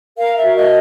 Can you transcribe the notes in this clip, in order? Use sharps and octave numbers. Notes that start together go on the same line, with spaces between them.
A#4 F5
E5
F#4
D#5